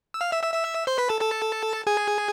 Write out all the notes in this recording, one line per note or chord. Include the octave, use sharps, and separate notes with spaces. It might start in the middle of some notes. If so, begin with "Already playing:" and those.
E6
F5 F6
E5 E6
E5 E6
E5 E6
C5 C6
B4 B5
A4 A5
A4 A5
G#4 G#5